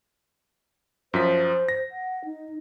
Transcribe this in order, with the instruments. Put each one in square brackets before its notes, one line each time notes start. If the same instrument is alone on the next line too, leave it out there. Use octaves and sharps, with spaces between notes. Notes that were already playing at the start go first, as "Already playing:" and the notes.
[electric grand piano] F#2 F3 B6 [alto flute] C5
[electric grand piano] A#6
[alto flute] F#5
D#4